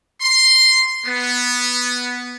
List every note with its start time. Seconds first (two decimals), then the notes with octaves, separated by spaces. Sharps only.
0.21 C6
1.06 B3